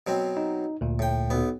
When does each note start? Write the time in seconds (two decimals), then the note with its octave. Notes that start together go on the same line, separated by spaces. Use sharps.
0.07 B2 F#3 C4
0.37 D#4
0.81 D2 A#2
0.99 A2 G5
1.30 B1 B3